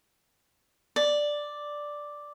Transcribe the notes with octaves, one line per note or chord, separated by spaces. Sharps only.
D5